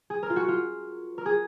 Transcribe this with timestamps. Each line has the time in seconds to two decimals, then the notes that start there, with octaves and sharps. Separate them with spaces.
0.10 G#4
0.23 A#4
0.30 F4
0.36 F#4
0.48 F4
1.18 A#4
1.26 G#4